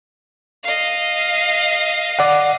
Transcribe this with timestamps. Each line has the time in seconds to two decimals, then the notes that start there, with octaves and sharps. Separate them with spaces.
0.63 D#5 F5
2.19 D5 F#5